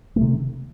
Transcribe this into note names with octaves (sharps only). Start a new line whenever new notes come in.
C3 D#3 F#3 A3